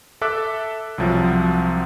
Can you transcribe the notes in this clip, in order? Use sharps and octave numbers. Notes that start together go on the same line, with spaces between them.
A4 E5 D6 F#6
C2 C3 F3 F#3